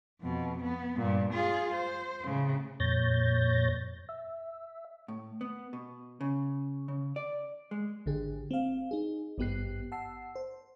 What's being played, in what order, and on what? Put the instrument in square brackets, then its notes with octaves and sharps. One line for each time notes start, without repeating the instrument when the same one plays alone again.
[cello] F2 B2
B3
G2 A#2
F4 G#4
C5
A2 C#3
[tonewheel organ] F2 A#2 C#5 G6 A6 A#6
E5
[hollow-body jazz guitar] A2
B3
B2
C#3
C#3
D5
G#3
[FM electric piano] G#1 D3 G4 G#4
C4 F5
D#4 G#4
G#1 G2 B3 G4 F#6 C7
F#5 A5 E6 C7
C5